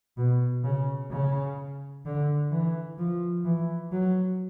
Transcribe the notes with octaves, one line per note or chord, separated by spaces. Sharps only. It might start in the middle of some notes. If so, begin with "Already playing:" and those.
B2
C#3
C#3
D3
E3
F3
E3
F#3